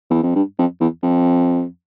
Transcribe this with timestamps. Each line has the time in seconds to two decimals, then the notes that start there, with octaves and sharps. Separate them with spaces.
0.10 E2
0.23 F2
0.35 G2
0.58 F2
0.80 E2
1.03 F2